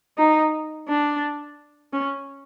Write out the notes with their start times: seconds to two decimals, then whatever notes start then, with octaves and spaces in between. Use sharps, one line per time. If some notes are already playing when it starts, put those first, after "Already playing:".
0.18 D#4
0.88 D4
1.93 C#4